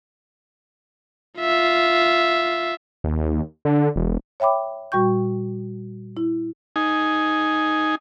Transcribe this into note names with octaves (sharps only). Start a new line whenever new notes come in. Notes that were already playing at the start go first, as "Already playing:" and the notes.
F4 E5
D#2
D3
E1
C#5 E5 G5 B5 D6
A#2 G3 F#4 G5 C#6 G6
E4
D#4 G#5